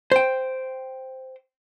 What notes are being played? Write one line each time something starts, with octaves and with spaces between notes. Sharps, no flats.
C5 G5